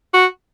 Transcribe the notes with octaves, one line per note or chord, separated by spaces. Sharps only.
F#4